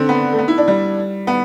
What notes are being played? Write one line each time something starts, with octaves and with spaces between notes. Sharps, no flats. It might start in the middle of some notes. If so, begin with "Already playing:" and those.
Already playing: D3 C4
B3
A3
B3
E4
D4
G3
B3